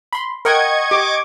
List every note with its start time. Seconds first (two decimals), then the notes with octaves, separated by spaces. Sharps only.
0.13 B5 C6
0.45 A#4 D#5 F#5 G5 C#6 G#6
0.91 G4 D6